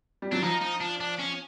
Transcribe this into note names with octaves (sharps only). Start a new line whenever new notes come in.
G3
F#3 D4
F3 D#4
D#4
D4
D4
C#4